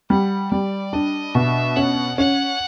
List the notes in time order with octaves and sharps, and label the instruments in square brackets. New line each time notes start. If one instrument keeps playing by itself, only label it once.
[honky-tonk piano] G3 [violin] F#5
[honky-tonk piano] G3 [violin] D5
[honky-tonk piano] D4 [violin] D#5
[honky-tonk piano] B2 [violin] E5
[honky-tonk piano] C#4 [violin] F#5
[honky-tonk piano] C#4 [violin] F#5